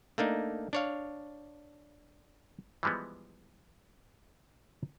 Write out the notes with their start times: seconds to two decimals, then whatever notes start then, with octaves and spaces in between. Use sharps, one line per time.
0.18 A3 A#3 D4 D#4
0.73 D4 C#5 F5
2.83 E3 F3 G3 G#3 B3